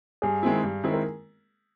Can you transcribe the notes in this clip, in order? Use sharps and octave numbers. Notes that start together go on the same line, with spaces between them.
G2 G#4
D#3 G#3 C4 E4
G2
D#3 G#3 C4 E4
A#4